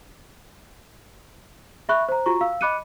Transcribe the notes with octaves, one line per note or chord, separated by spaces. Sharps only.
E5 B5 C#6 F#6
C5 A#5
F4 F#4 A#5 C#6
F5 E6
D#5 B5 D6 F#6 C#7 D#7